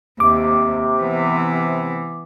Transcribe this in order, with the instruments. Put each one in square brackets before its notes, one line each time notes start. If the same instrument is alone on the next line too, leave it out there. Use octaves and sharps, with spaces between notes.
[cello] D#2 [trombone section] C3 [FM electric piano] D6
[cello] E3 B3